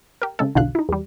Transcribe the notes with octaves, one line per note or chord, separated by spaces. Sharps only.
G4 A#4
C#3 G#3 A4
B1 E2 B2 D3 F5 F#6
D#4 E4
E2 G3